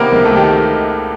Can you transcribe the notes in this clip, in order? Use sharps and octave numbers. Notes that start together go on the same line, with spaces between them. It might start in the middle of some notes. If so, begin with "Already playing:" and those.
Already playing: C3 D#3 A#3 B3 A#4 B4
C#2
A3 A4
D#3 G4